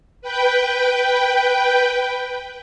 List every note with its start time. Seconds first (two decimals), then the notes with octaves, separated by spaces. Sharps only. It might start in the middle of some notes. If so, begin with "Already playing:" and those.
0.22 B4 G5